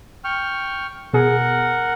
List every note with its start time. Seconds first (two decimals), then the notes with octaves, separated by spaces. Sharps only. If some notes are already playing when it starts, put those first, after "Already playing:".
0.24 G5 C#6 F6
1.13 B2 G#4 A#4 F#5